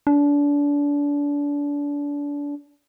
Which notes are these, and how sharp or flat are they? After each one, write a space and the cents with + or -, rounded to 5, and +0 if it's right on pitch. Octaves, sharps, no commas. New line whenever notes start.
D4 -30